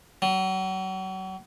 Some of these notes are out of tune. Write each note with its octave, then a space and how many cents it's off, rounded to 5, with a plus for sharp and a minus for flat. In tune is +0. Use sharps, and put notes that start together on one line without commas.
F#3 +35